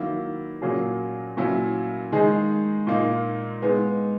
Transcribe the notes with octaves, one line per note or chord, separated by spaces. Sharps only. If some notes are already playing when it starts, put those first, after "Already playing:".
Already playing: D#3 F#3 A#3 E4
A#2 F#3 A#3 C#4 G#4
A#2 F#3 C#4 E4
D#3 G#3 D#4 G#4
A#2 A#3 D#4
G#3 B3 D#4